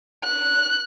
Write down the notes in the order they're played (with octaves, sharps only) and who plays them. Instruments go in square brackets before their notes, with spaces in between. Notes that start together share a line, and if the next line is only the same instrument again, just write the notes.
[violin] F#6